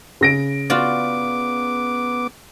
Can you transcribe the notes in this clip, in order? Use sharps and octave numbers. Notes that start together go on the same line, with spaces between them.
C#3 A#6 D7
B3 F4 F#4 D5 D6